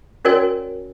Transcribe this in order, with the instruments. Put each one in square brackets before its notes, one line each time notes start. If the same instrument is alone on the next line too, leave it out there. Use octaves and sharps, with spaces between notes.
[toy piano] C#4 F#4 A#4 C#5 D5 G#5